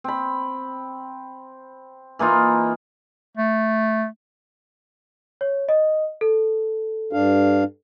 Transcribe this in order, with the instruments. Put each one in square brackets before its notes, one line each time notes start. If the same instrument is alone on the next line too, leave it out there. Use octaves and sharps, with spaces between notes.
[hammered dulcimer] C4 B5
E3 A#3 D#4 F4
[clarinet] A3
[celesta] C#5
D#5
A4
[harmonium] G2 D4 F5